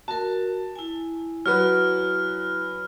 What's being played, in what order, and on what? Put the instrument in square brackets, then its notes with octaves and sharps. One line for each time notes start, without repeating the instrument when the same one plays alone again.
[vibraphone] F#4 A#4 [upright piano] A5
[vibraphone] E4 G#5
[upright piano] F#3 F#4 B4 [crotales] F6